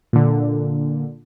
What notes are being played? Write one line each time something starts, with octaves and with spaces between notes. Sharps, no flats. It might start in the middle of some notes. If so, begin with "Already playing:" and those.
A#2 D3